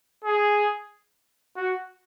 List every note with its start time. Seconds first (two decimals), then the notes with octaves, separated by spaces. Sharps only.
0.25 G#4
1.56 F#4